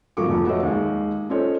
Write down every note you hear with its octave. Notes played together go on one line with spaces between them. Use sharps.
G#1 F3 F#3 A#4 C#6 D6
F1 F2 F3
B3 F#4 B4 C#5 D#5 E5
D#2 G#3
C#4 F4 A4 C5 C#5 D#5